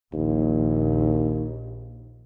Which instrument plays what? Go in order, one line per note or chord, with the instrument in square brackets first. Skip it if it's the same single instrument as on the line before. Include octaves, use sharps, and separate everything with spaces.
[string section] A#1 [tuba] D#2